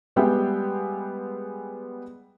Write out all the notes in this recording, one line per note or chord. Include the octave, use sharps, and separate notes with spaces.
G3 G#3 B3 E5 G5